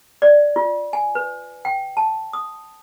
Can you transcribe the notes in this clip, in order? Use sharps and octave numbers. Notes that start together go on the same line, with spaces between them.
D5
F4
G#5
B4
G5
A5
D#6